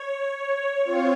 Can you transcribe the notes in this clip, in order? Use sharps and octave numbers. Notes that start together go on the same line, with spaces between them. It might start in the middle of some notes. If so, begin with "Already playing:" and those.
Already playing: C#5
C4 F4